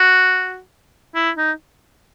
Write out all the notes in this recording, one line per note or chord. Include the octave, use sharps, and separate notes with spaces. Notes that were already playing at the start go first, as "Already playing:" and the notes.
Already playing: F#4
E4
D#4